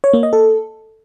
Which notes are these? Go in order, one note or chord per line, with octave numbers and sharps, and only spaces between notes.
C#5
A#3
D#5
A4